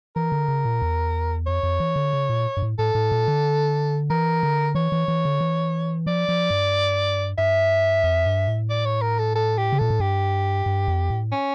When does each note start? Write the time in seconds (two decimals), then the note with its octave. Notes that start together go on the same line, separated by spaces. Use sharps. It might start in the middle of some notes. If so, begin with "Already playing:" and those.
0.16 E3 A#4
0.32 D3
0.48 C#3
0.65 A#2
0.82 E2
1.46 F2 C#5
1.63 F2
1.80 E3
1.96 D3
2.13 C#3
2.30 A#2
2.57 G2
2.62 A2
2.79 A2 A4
2.95 A2
3.12 A#2
3.28 D3
4.10 E3 A#4
4.43 D3
4.75 E3 C#5
4.92 E3
5.08 E3
5.25 D3
5.41 E3
6.06 F3 D5
6.29 F3
6.50 G2
7.38 G2 E5
8.04 F2
8.26 G2
8.47 A2
8.70 D5
8.85 C#5
9.01 A#4
9.18 A4
9.35 A4
9.57 G4
9.73 C#3
9.79 A#2 A4
9.90 A2
10.00 G2 G4
10.66 G2
10.88 F2
11.10 A2
11.32 C#4